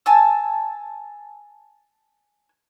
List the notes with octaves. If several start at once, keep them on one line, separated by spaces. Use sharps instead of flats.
G#5 A5 E6